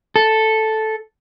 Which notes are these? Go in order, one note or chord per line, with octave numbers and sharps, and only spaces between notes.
A4